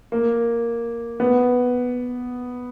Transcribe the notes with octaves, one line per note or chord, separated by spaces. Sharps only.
A#3
B3